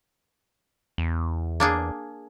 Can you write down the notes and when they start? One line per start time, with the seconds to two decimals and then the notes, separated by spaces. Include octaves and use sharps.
0.98 E2
1.60 A#3 D4 G#4